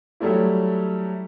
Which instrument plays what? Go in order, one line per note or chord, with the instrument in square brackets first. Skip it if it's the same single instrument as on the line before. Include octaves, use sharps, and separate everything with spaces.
[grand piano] F#3 G3 A3 E4